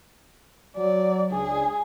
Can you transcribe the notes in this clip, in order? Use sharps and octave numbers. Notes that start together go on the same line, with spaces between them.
F#3 D5
C#2 D4 G#4